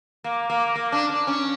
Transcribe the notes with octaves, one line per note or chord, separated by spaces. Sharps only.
A#3
A#3
A#3
D4
D4
C#4